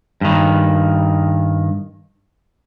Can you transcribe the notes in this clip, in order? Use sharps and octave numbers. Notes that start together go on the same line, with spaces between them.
G2 D#3